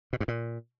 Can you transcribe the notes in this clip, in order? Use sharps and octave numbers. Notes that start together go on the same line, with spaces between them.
B2
G2
A#2